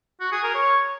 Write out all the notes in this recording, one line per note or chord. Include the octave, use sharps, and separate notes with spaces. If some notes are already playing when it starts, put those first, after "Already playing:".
F#4
G#4
A#4
C#5